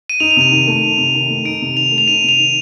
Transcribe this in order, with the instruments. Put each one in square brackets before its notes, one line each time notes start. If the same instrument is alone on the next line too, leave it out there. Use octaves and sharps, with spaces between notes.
[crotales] D#7
[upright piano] D#4 [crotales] F7
[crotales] F7
[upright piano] C3 [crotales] D#7
[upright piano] D#3
[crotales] D#7
[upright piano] A3
D#4
C3
D#3
A3
[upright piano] D#4 [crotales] D7
[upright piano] C3
[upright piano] D#3 [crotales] F7
[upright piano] A3
[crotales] F7
[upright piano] D#4 [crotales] D#7
[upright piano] C3
[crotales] F7
[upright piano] D#3